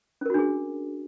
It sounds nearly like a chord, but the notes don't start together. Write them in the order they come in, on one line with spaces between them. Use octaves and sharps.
C#4 A#4 F#4 D4 G#4